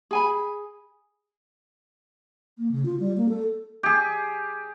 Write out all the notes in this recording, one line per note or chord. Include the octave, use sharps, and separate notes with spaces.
G#4 G#5 B5
A#3
C#3
F4
G3
A#3
A4
G4 G#4